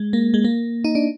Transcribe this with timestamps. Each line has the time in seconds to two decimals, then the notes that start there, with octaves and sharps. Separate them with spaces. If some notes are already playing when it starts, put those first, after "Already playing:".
Already playing: G#3
0.13 A#3
0.34 G#3
0.44 A#3
0.84 D#4
0.95 D4